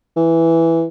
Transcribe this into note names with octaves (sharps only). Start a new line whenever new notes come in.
E3